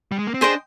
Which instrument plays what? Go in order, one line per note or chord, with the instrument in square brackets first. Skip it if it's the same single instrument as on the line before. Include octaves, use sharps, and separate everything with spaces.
[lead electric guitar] G3
G#3
A#3
C4
[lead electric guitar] D4 [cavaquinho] G#4 C5 D#5 G5